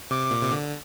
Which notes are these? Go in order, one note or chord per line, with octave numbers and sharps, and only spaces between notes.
C3 D6
A#2
C3
D3